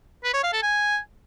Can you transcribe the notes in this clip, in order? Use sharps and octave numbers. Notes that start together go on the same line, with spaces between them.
B4
C#5
F5
A4
G#5